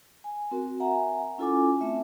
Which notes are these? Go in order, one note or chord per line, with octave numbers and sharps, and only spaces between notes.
G#5
C4 F#4 A#4
E5 F#5 G#5 A#5
C#4 E4 F4 A4 G#5 D6
A3 C4 E5